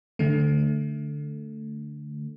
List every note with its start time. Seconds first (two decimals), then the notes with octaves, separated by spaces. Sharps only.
0.19 D3 A3